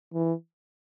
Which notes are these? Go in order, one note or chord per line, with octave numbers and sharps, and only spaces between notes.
E3